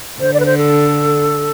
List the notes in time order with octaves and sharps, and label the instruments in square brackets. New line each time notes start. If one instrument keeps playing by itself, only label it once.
[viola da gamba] D3 [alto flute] C5
[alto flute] D5
B4
C5
A4